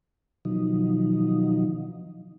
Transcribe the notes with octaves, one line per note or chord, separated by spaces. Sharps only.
B2 D#3 F3 F#3 D#4